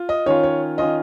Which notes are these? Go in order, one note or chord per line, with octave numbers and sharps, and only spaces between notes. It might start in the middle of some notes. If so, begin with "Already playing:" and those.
Already playing: F4
D#5
D#3 C#4 F4 C#5
C#5
D#3 C#4 F4 D#5